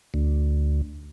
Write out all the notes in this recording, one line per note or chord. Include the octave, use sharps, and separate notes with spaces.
D2